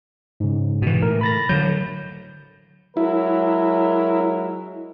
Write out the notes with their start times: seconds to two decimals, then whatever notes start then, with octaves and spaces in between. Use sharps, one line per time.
0.40 G#2 C#3
0.82 B2 E3
1.02 A2 A#4
1.21 B5 A6 A#6
1.49 D3 F#3 G6
2.97 F#3 G#3 E4 A#4